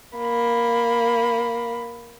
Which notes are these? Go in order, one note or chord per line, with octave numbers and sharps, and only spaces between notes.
A#3 B5